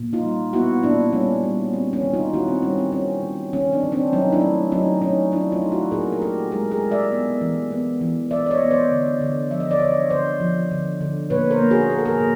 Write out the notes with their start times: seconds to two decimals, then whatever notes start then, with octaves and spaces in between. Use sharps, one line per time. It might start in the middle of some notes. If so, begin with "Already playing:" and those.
Already playing: A#2
0.13 D#4 F4
0.23 G3
0.53 B3 E4 F#4
0.83 A#2 D4 E4
1.13 G3 C#4
1.44 G3
1.73 C4
1.93 C#4
2.02 D#3
2.14 D#4 F4
2.33 D#3 E4 F#4
2.48 C4
2.63 G3 C#4
2.77 C4
2.92 C4 C#4
3.23 D#3
3.53 D#3 C#4
3.72 C4 D4
3.83 D#3
3.92 C4 D4
4.12 F#3 C#4 D#4
4.32 D4 E4
4.42 A3
4.72 F#3 C#4 D#4
5.02 A3 C#4 D#4
5.32 F#3 D4 E4
5.52 D#4 F4
5.61 A3
5.72 E4 F#4
5.91 A#2 G#4 A#4
6.12 A#4
6.22 A3 G4 A4
6.51 G#3 G#4 A#4
6.71 G#4 A#4
6.82 G#3
6.91 D5 E5
7.12 B3
7.41 E3
7.72 B3
8.01 E3
8.31 E3 D5 E5
8.46 D5
8.51 C#5 D#5
8.62 B3
8.71 C5 D5
8.92 D3
9.21 D3
9.50 F3 E5
9.60 D#5
9.71 D5
9.80 D3 C#5 D#5
10.10 D3 C5 D5
10.40 F3
10.71 D3
11.00 D3
11.30 A#2 B4 C#5
11.51 A#4 C5
11.60 A#3
11.71 F#4 G#4
11.90 A#3 A#4
11.99 A4
12.05 G#4 A#4
12.20 A#2